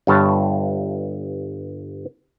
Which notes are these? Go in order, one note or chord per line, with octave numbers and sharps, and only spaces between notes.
G1 G2 C#5 A5